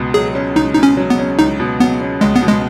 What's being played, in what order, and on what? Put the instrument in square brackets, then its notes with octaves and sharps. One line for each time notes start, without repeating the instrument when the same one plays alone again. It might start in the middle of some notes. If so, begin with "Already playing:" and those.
Already playing: [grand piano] C#2 B2
[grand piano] F#3 [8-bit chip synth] G#4
[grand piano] C#4
[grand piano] C#2 [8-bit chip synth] D#4
[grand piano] B2 [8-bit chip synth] D#4
[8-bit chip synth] C#4
[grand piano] F#3
[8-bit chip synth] B3
[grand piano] C#4
[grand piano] C#2 [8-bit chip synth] D#4
[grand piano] B2
[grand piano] F#3 [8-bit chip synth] B3
[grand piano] C#4
[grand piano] C#2 [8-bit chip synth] G#3
[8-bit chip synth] B3
[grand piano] B2
[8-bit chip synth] G#3